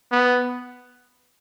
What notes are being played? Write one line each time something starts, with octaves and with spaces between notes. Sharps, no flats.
B3